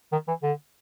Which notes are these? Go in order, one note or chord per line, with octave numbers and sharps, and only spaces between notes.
D#3
E3
D3